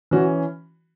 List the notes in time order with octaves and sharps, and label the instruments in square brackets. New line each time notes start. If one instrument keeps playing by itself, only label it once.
[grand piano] E3 C#4 F#4